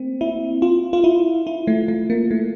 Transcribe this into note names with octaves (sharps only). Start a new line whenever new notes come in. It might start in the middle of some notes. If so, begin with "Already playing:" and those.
Already playing: A3 A#3 C4
E4
F4
F4
E4
E4
A3
A3
A#3
A3